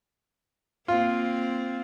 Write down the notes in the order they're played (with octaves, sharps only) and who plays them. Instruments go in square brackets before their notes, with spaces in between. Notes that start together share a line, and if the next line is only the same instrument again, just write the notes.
[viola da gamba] A#3 C4 [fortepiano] F4